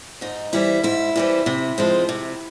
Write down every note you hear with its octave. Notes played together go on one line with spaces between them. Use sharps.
G#2 D#4
E3 G3 C4 E4
G#2 E4
E3 G3 C4
C3
F3 G#3 C4
C3